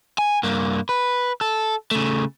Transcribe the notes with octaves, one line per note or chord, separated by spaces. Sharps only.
G#5
G2 A#3
B4
A4
C#3 A3